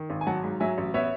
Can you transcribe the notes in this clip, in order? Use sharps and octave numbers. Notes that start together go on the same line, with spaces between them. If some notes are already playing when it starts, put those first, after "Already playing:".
Already playing: D#3
G#1
G#5
F#3 F#5 A5
G#2
F#3 E5 G#5
A1
B3 C#5 E5